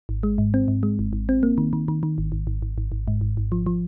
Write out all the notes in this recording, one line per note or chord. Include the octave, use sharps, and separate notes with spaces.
G#1
G#3
G#2
C4
G#2
G#3
G#1
G#1
C4
A#3
D#3
D#3
D#3
D#3
G#1
G#1
G#1
G#1
G#1
G#1
G#2
G#1
G#1
F3
F3